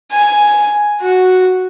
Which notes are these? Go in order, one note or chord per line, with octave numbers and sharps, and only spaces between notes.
G#5
F#4